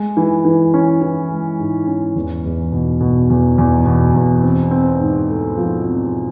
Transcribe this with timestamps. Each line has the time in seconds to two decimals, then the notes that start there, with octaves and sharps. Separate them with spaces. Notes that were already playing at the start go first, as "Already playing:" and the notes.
Already playing: G#3
0.17 E3
0.45 E3
0.74 C#4
1.01 E3
1.30 G#3
1.59 G#2
1.87 C#4
2.15 E2
2.45 E2
2.72 B2
3.01 B2
3.30 E2
3.58 E2
3.86 B2
4.15 E2
4.43 C4
4.71 C4
5.00 G#2
5.28 A3
5.58 F3
5.85 C4